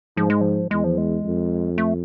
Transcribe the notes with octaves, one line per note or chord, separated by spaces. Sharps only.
G#2 F3
G#3
F3
E2 G#3
F3
G#3
F2
A3